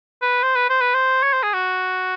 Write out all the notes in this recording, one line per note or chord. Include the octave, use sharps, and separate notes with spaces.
B4
C5
B4
C5
B4
C5
C#5
C5
G#4
F#4